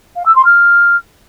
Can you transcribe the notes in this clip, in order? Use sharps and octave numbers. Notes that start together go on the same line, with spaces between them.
F5
E6
C6
F6